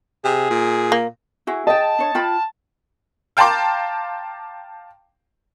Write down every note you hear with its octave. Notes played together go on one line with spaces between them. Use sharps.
C3 G#4
A#2
A#3
E4 F#4 G#4
G#4 D#5 G5 A5
D4 C#5
F4 G5 B5
F5 G5 A5 A#5 C6 D6